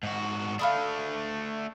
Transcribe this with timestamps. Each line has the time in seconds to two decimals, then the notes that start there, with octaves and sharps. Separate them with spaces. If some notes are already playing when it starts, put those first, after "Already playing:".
0.03 G#2 F#4
0.59 A3 D4 F5 B5 D#6